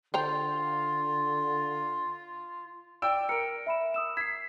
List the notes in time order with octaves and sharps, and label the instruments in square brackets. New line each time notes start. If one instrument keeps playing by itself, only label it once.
[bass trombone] D3 [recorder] F4 [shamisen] C5 G5 A#5
[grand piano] D5 G5 E6 [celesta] D7
[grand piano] A#4 [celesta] C#7 D7
[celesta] E5 B5 E7
D#6 E6 E7
[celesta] G#6 C7 [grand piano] B6